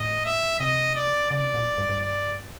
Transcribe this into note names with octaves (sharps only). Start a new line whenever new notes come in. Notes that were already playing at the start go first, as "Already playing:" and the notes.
Already playing: A2 D#5
E5
C3 D#5
D5
C#3 D5
C3
A#2
G2
G2
D5